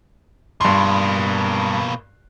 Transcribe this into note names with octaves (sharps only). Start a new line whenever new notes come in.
G2 B2 A#3 C6